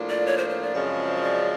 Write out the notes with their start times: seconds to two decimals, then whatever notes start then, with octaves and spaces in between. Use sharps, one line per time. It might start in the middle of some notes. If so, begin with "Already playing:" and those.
Already playing: A2 F3 A#3 D4 F4
0.09 D5
0.26 C#5
0.38 C5
0.49 C5
0.62 D5
0.74 F#2 C#3 F3 G#3 C4
1.15 D#5
1.22 D5